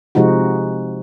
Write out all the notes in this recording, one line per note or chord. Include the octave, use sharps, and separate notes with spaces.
C3 F3 G#3 D#4 F#4